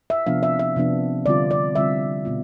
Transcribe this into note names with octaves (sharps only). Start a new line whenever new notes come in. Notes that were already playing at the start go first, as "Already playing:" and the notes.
E5
C3 F3 B3 D4 F5
E5
E5
C3 F3 B3 D4
D3 G3 C4 F4 D5
D5
D3 G3 C4 F4 E5
B2 B3 F4